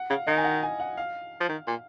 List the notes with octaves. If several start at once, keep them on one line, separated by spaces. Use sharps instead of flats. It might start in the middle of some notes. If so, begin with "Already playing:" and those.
Already playing: F#5
C#3 F5
D#3 D#5
G#5
F#5
G#5
F#5
F5
F3
D#3
A#2